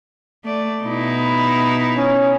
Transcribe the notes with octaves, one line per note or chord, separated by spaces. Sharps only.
A3 D5
B2 D#4 E4
B5
C#4